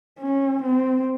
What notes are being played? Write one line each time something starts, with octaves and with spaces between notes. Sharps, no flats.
C#4
C4